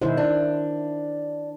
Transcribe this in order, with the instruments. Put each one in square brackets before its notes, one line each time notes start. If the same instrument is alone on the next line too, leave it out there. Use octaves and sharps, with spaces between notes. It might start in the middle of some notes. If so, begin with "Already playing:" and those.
[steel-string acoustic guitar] F#2 B2 G#3 [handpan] D#3 E4 C5
[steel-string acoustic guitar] D4